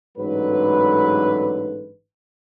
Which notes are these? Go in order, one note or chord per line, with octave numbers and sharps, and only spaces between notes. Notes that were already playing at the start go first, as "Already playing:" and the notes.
A1 G#2 D3 F#3 B4